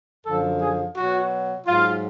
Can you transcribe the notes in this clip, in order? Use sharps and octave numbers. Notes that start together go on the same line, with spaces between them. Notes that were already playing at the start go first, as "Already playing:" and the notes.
F#2 D3 F3 A4
G#4
B2 F#3 F#4
G#2 F#3 F4